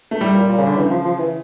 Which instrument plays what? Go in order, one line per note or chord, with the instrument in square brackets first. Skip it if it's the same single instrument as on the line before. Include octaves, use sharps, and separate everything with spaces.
[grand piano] A3
[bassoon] A2 [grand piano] G3
[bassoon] A#2
A#2
C#3
D3
[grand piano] C#3 [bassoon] E3
[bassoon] F3
F3
E3